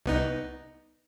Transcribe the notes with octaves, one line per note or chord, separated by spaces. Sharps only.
C2 B3 D#4